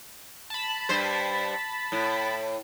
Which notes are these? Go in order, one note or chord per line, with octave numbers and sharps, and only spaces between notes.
A5 B5
G2 C5
A2